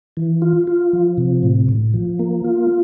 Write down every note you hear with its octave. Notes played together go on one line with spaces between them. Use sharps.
E3
F4
F4
F3
C3
A2
A2
F3
A#3
F4